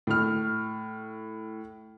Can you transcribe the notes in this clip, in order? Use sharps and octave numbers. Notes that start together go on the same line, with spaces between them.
A2 F6